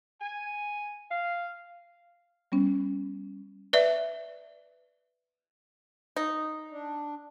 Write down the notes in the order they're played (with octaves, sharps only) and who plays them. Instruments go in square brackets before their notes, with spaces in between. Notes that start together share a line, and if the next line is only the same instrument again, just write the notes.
[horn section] G#5
F5
[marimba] G3 B3 C#4
[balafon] B4 D5 E5
[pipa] D#4
[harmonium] D4